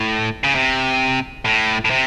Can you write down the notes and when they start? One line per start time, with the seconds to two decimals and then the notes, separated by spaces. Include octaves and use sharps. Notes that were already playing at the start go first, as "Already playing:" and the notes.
Already playing: A2
0.44 C#3
0.55 C3
1.45 A2
1.85 A2
1.91 C3